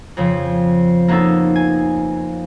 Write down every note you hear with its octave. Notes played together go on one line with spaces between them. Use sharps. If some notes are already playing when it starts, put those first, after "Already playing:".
F2 C#3 F3
A#3 B3 C#4 D#4 A4
G#5